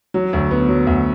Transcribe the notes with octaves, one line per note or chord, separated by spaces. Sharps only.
F#3
D2
B3
F#3
D2